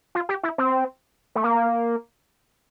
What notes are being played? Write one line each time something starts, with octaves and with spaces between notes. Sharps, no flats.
F4
G4
E4
C4
A3
A#3